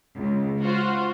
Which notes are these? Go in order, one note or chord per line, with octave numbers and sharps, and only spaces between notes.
C#2
F4 F#4 C5